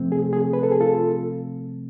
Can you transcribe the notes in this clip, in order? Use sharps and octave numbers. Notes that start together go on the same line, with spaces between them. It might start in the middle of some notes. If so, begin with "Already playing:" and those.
Already playing: C3 F3 A3 C4
G#4
G#4
B4
A4
G#4
F4 A4